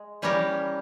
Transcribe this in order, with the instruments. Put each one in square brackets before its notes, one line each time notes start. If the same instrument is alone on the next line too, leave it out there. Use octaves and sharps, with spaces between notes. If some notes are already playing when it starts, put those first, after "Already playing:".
Already playing: [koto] G#3
E3 G3 C#4 G4 A#4